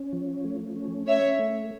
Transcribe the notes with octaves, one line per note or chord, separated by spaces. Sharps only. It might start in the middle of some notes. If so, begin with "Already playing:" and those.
Already playing: C#4
F3
A3
C#4
C#4 C#5 E5
A3